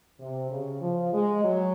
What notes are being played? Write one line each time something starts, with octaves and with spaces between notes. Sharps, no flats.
C3
C#3
F3
G#3
F#3